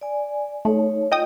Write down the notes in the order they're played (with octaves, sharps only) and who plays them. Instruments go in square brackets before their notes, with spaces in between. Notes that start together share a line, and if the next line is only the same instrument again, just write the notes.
[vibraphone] D5 G#5
[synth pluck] A3 [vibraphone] D#4 C#5
[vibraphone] F4 [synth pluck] D#5 G5 D#6